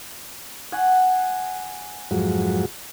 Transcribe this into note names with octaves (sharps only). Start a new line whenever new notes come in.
F#5 G#5
F2 G#2 F#3